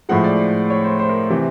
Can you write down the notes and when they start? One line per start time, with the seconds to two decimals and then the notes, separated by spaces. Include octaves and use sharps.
0.09 A2 F3 G#3 F#5
0.24 D5
0.70 C#5
0.84 C5
0.99 C5
1.09 A#4
1.30 C3 E3